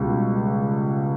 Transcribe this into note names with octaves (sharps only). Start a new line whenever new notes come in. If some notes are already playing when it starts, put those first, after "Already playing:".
Already playing: C#2 B2 G3